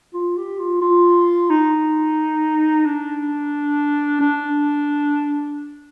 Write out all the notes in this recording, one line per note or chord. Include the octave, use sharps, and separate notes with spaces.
F4
G4
F4
F4
D#4
D4
D4